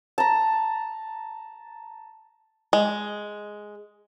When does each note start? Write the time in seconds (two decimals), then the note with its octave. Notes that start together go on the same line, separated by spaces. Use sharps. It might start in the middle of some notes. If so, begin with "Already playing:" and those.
0.18 A5 A#5
2.73 G#3